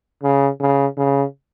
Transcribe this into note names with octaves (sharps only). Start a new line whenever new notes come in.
C#3
C#3
C#3